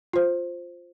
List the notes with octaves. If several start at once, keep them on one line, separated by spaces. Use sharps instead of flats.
F4 C5